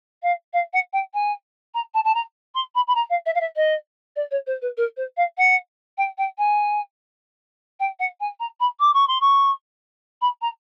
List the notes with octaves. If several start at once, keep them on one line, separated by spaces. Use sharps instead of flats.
F5
F5
F#5
G5
G#5
A#5
A5
A5
A#5
C6
B5
B5
A#5
F5
E5
F5
E5
D#5
D5
C#5
C5
B4
A#4
C5
F5
F#5
G5
G5
G#5
G5
F#5
G#5
A#5
B5
D6
C#6
C6
C#6
B5
A#5